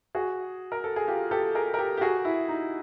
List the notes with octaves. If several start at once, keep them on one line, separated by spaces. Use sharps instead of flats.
F#4 G#4
A#4
A4
G#4
F4 G4
G4 A4
G#4 A#4
A#4
G4 A4
G4
F#4 G#4
E4
D#4